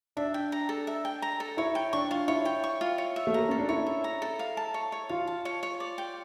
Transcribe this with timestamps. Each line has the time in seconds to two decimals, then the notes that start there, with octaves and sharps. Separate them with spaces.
0.17 D4 E5
0.34 G5
0.52 A#5
0.69 A4
0.87 E5
1.05 G5
1.22 A#5
1.40 A4
1.57 E4 C#5
1.75 G5
1.93 D4 C#6
2.11 F4
2.28 E4 C#5
2.45 G5
2.64 C#6
2.81 F4
2.98 C#5
3.16 E5
3.27 A3
3.34 A#3 A#5
3.49 C#4 A4
3.59 D4
3.68 E4 C#5
3.87 E5
4.04 A#5
4.22 A4
4.39 F5
4.57 A5
4.74 C#5
4.92 C#5
5.09 F4 F5
5.28 A5
5.45 C#5
5.63 C#5
5.80 D5
5.98 G5